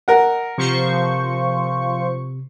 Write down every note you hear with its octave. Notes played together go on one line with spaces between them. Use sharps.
A#4 D#5 F#5
C3 F3 C5 C#6